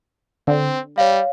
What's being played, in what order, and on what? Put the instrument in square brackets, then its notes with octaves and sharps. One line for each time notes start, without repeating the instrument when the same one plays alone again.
[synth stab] D3 [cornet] C4
[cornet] G3 [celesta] C#5 F5